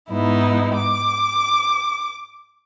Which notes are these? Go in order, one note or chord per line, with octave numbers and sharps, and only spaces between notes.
G#2 B3 D#4 E4
D6